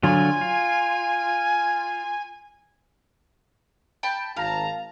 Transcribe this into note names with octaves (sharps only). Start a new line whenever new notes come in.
D3 F#3 F4 G#5
F4
G5 A5 B5
G#1 F5 A5 A#5